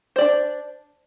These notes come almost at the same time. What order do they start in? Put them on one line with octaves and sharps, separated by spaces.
C5 D5 D4